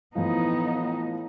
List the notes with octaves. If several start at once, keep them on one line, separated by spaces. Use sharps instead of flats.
A2 E3 F3 B3 D#4